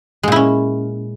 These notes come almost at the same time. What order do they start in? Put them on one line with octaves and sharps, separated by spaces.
G#3 A#2 E4 C#4